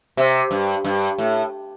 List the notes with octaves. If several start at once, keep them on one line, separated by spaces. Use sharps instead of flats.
C3
G2
G2
A2